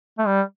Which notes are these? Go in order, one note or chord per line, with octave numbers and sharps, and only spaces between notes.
A3
G3